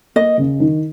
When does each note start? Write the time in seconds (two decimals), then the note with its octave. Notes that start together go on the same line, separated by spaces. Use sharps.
0.16 A#3 D#5
0.38 C#3
0.60 D#3